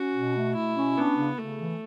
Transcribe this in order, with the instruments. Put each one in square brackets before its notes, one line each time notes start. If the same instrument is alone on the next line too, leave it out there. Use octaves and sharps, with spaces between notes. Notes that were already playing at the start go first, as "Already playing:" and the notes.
Already playing: [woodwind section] C#4 [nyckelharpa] F#4
[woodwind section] B2
A3
[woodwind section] B2 [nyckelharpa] E4
[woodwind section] C#4
[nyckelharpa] B3 [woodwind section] D4
[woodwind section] C#3
[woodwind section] C#3 [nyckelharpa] A3
[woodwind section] E3